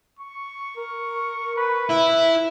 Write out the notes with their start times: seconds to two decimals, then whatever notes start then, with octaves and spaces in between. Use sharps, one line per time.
0.19 C#6
0.77 A#4
1.56 B4
1.89 E4 E5